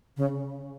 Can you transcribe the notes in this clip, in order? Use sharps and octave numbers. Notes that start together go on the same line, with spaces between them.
C#3